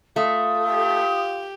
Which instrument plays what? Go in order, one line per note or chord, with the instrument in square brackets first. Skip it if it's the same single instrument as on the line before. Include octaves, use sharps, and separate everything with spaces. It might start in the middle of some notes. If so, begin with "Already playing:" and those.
[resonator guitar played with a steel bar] A3 [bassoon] F4 [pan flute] D#6
[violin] G4